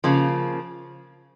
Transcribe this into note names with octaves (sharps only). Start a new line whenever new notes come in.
C#3 F3 A#3